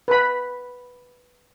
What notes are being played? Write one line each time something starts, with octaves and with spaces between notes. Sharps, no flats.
B4 B5